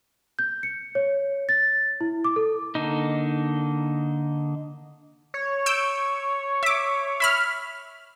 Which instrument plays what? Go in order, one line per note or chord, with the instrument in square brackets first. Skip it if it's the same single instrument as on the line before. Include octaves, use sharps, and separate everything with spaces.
[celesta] G6
C#7
C#5
A6
E4
D6
A4
[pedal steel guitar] D3 A#3 D#4
[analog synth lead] C#5
[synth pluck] E6 G6 D7
E5 D6
E5 B5 F6